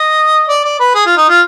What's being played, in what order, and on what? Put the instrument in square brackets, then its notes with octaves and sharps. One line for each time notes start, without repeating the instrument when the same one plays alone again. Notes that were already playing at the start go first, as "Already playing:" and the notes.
Already playing: [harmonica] D#5
D5
D5
B4
G#4
F4
D#4
F4